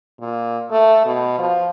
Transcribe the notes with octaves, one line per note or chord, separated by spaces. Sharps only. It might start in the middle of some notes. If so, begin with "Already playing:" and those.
A#2
A3
B2
F3